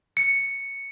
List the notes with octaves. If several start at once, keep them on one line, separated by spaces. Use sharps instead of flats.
C#7